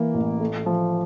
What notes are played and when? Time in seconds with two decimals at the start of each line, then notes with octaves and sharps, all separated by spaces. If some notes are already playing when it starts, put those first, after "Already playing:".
Already playing: E3 A#3
0.14 A1
0.40 A3
0.66 F3